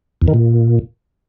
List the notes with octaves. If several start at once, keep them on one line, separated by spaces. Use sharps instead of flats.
E2
D#3
A#2